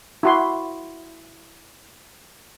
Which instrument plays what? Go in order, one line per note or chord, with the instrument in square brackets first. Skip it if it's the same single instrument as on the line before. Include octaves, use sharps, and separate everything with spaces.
[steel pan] E4 F#4 C6